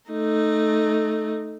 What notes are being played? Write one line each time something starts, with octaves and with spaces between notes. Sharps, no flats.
A3 D#4